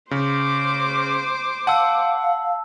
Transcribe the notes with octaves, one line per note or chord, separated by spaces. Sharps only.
C#3 C5 D6
F5 F#5 A5 E6